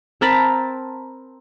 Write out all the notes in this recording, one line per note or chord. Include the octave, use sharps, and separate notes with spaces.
C4 A#4 A5 B5